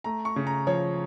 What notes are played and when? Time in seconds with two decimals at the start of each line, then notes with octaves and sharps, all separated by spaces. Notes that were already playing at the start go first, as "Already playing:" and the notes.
0.04 A3 A#5
0.25 C#6
0.36 C#3
0.47 A#5
0.67 F3 C#5